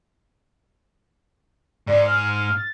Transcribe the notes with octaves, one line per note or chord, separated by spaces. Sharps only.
G#2 D5
F6
A6